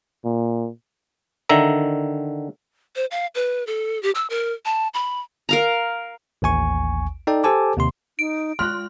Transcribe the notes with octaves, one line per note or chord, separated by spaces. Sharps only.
A#2
D3 D#3 E5 A#5
C5
F5
B4
A4
G4
E6
A#4
A5
B5
A#4 F5 A#5
A1 D#2 G#5 C#6
D#4 A4 D5 G5
G4 A4 C5 G#5 A5 D6
D#2 C3 C6
D#4 D7
G#3 F4 C6 F6 F#6